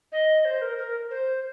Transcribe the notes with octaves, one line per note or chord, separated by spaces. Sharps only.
D#5
C5
A#4
A#4
C5